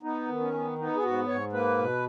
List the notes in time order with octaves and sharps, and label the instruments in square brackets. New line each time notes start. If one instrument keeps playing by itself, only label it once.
[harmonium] B3 D#4
D#3
C#4
B3
B3 D#4
G#4
G#2 F#4
G#2 C#5
A#3 B4
B2